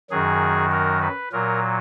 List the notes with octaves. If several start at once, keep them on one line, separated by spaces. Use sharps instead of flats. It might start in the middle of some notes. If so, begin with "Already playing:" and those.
F#2 D#3 F#3 G#4
A#4
B4
A#2 F#3 A#4